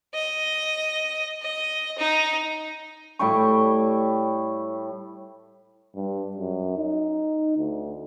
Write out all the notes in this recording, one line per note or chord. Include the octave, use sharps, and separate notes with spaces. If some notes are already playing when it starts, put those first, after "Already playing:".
D#5
D#5
D#4
A2 G3 G5 C#6
G2
F#2
D#4
D2